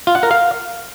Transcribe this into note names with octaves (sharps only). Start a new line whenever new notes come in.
F4
F#5
A#4
F5